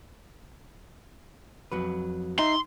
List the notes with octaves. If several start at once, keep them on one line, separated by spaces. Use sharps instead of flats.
F2 F#3 B4
D#4 E5 C6